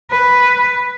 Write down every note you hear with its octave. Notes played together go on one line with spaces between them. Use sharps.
B4